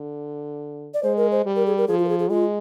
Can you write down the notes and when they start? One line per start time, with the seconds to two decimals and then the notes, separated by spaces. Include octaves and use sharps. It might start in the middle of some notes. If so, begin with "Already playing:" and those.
Already playing: D3
0.94 D5
1.03 G#3 C5
1.17 A#4
1.32 C5
1.45 G3
1.56 A#4
1.66 G#4
1.78 A#4
1.88 F3 G#4
1.98 F4
2.05 A#4
2.09 G#4
2.19 G#4
2.30 G#3 F4